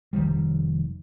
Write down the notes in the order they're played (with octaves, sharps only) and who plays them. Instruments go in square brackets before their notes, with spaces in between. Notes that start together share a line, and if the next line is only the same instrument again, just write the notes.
[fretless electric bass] F1 C2 D#3 G3